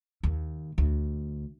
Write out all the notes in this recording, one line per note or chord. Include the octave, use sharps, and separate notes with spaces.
D#2
D2